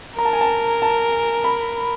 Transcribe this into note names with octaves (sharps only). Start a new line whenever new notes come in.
A#4 A#5
A5
G#5
A5
A5
B5